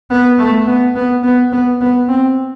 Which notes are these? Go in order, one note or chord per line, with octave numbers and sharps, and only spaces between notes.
B3
A3
B3
B3
B3
B3
B3
C4